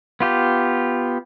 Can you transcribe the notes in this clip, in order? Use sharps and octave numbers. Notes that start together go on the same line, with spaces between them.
B3 F4 G4